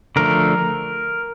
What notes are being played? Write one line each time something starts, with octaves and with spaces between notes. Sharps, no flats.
D3 F3 A3 A#4